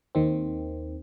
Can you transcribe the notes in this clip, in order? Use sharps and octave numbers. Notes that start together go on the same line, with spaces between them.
D#2 D#3 C4